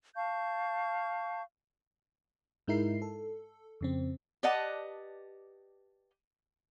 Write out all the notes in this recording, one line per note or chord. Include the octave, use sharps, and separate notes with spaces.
F5 A5 C#6 G6
G#2 G#3 D#4 E4 A#4 C7
A4
F2 C#3 C4
G4 B4 D5 D#5 F#5 A5